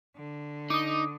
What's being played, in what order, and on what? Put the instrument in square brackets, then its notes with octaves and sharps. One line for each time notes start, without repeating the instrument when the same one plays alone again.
[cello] D3
[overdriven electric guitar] D#4 [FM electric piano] D6 D#6